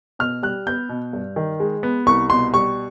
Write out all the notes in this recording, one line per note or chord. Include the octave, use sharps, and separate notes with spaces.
B2 F6
G3 F#6
B3 G6
B2
G2
D#3
G#3
B3
C2 C#6
B2 C6
G3 C#6